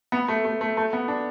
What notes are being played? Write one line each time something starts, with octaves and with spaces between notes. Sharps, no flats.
B3
A3
A3
A3
A3
B3
D4